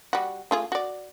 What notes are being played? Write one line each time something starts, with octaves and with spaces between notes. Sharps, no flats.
G3 F#4
A3 F4 G#4
F#4 D5